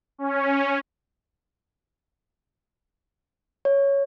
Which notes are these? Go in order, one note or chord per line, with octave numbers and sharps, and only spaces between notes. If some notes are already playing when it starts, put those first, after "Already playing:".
C#4
C#5